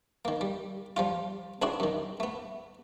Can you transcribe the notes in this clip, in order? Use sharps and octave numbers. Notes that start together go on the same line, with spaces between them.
D#3 A#3
G3
F3 G3 F4
C#2 C4 D4 E4 F#4 G#4
F#2 D#3
A3 B3